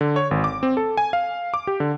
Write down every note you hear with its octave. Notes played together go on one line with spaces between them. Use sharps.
D3
C#5
G#1
D6
C4
A4
G#5
F5
D6
G4
D3